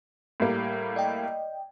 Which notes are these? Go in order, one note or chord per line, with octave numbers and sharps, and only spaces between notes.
A2 G3 A#3
D5 D#5 G5